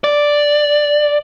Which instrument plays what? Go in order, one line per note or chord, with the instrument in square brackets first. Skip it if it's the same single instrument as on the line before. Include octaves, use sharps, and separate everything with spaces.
[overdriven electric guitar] D5